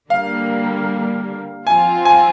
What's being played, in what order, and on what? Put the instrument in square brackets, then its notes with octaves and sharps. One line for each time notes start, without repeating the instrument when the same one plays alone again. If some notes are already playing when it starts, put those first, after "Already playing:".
[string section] D3 G3 A#3 [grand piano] F5
[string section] F3 C4 F4 [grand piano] G#5
[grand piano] G#5